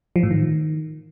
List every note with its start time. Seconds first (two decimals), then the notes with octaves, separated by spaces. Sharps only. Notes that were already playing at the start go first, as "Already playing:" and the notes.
0.16 F3
0.23 A2
0.31 D#3